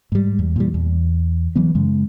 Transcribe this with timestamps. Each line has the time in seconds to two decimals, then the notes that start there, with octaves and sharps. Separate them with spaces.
0.12 G#2 G3
0.39 E2
0.56 A#2 E3 G3
0.74 E2
1.55 E3 F#3 B3
1.75 F#2 C#3 G#3